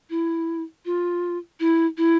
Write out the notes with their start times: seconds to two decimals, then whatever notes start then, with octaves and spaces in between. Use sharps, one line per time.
0.10 E4
0.85 F4
1.60 E4
1.98 E4